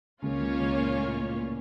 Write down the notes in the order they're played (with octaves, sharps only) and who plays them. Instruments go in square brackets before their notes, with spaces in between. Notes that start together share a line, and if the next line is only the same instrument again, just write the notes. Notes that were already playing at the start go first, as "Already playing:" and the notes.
[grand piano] C#2 C#3 [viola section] A#3 C#4 F4 C#5
[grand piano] C#2 C#3
C#2 C#3
A#2
A2
A#2
A#2